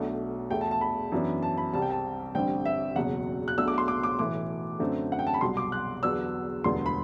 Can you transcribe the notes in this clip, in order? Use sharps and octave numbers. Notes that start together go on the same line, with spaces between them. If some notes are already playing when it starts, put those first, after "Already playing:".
Already playing: B1 B2 A3 D4
E2 B2 A3 G5
A5
A5
B5
F#2 E3 B3 D4
A5
B5
C2 C3 G3 C4 A5
G5
A5
A1 G2 D3 G3 C4 G5
E5
F#1 E2 B2 F#3 F#5
F#6
B1 B2 A3 D4 E6
D6
C6
D6
D6
B1 A2 E3 D6
F#2 D3 A3 C4
F#5
G5
A5
B5
C2 B2 F#3 C6
D6
F#6
E2 D3 F#3 B3 D4 E6
E1 D2 D3 G3 B3 C6
B5